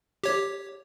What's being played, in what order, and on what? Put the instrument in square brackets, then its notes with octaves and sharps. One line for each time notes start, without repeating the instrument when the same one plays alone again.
[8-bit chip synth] G4 C#5